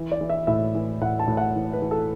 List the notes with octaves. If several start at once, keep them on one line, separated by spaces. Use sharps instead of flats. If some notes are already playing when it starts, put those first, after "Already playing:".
Already playing: E3
D5
E3
E5
A2 E5
E3
A2 F#5
A5
A2
F#5
E3
B4
E3
A4